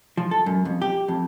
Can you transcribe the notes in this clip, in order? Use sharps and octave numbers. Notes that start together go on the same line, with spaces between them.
F3
A4
F#2
F2
G4
F2